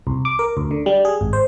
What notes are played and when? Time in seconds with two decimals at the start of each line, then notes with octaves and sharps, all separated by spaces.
0.07 C2
0.25 D6
0.39 A#4
0.57 D2
0.71 D3
0.86 G3
1.05 G#4
1.21 G#1
1.33 C5